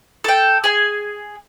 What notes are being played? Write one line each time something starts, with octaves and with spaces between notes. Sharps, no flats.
A4 G5
G#4 G#5